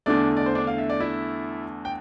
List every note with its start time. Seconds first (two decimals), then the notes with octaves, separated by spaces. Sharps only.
0.06 E2 D3 A3 D4 D5
0.37 D5
0.46 C5
0.55 D4 D5
0.67 F5
0.78 E5
0.90 D5
1.00 E4 E5
1.85 G5